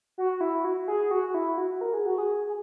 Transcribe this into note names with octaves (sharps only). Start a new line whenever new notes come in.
F#4
E4
F#4
G#4
F#4
E4
F#4
A#4
G#4
F#4
G#4
G#4